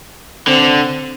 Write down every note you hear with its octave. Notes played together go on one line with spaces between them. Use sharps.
D3 C4